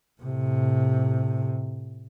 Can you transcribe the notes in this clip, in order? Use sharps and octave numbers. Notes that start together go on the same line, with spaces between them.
A2 C3